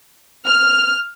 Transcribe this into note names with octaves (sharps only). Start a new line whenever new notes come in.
F6